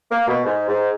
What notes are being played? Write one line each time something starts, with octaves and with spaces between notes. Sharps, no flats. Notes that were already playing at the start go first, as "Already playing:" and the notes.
A#3
B2
G#2
G#2